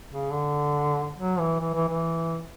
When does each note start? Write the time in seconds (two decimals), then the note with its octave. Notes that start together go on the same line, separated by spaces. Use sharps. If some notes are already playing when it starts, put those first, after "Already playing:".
0.10 C#3
0.32 D3
1.18 F#3
1.39 E3
1.61 E3
1.75 E3
1.89 E3